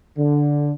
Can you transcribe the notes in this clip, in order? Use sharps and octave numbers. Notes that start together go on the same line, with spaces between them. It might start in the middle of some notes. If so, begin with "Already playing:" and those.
D3